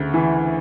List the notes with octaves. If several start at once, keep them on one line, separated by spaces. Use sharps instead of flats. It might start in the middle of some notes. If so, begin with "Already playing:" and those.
Already playing: D2 C#3
E3